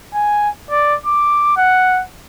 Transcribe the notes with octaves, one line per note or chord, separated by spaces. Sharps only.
G#5
D5
D6
F#5